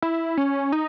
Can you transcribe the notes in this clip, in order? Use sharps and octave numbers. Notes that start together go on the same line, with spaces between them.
E4
C#4
D#4